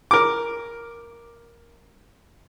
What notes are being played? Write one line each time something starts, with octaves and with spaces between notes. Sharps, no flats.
A#4 D6